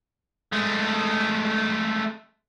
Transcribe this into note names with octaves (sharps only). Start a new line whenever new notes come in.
G#3 A3